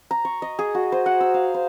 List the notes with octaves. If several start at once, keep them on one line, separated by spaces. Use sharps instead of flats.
A#5
C#6
D#5
G#4
F#4
C5
F#5
E6
F5
C5